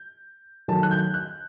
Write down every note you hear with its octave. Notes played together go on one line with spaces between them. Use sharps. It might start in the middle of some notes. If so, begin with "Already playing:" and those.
Already playing: G6
D#3 F#3 A3 A5
F#6
G6
F#6